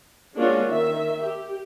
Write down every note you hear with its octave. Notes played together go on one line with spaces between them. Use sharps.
G#3 A#3 C#4 D4 F4 F#4
D#3 E5
G4